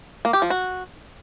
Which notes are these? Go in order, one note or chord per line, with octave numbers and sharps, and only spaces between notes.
A#3
G4
F3
F#4